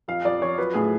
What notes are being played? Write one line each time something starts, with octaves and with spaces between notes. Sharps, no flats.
F2 F5
F2 D5
F3 C#5
F#3 B4
A2 G#4